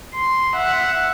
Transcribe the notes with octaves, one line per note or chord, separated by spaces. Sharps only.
C6
E5 F#5